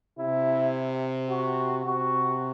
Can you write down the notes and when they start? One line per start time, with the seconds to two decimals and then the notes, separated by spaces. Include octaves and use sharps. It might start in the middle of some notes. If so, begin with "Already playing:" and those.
0.19 C3 E4
1.30 F#4
1.85 C3 F#4